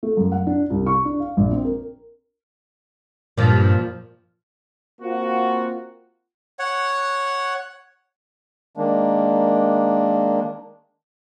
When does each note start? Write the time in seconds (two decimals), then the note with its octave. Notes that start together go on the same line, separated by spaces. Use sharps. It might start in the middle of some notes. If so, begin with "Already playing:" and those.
0.03 A3
0.17 F#2
0.32 F#5
0.47 D4
0.70 C2
0.86 C#6
1.05 D4
1.20 F5
1.37 A#1
1.51 C4
1.64 A#4
3.38 G2 A#2 F3
5.01 A#3 C4 F4 F#4
6.59 C#5 F#5
8.77 D#3 G#3 A#3 D4